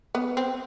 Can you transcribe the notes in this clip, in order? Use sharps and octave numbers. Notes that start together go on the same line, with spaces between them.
B3
C4